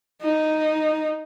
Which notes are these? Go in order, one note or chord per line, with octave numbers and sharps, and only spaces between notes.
D#4